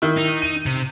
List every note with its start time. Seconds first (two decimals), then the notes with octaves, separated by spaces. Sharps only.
0.02 D#3 E4
0.18 D#4
0.42 D#7
0.66 C3